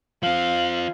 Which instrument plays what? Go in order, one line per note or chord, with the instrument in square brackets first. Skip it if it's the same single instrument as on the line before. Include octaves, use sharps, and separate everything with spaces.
[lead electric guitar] F3 C4 [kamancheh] F5